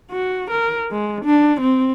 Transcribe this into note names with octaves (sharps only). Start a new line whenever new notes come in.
F#4
A#4
G#3
D4
C4